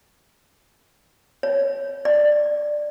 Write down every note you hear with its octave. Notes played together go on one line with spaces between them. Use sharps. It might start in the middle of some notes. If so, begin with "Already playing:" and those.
C#5
D5